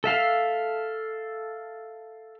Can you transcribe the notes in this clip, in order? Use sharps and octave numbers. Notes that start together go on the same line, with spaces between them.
A4 E5 F5